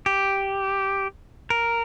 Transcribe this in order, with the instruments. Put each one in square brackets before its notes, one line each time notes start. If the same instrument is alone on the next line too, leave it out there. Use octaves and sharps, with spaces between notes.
[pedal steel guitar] G4
A#4